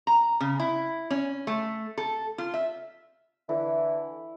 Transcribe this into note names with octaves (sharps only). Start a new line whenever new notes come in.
A#5
C#3
E4
C#4
A3
A4
F4
E5
D3 E3 E4